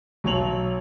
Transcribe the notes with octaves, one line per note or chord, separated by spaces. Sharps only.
B1 F#3 C#5 F7 F#7